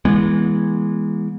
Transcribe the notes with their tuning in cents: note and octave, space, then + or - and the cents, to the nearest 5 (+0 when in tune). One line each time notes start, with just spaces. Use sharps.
E3 +0 G#3 -10 B3 -35